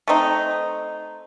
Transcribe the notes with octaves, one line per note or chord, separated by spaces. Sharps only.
A3 C4 D#4